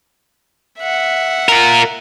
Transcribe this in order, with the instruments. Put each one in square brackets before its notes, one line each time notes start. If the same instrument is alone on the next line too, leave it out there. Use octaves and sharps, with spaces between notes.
[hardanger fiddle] E5 F#5
[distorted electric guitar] F4 A#4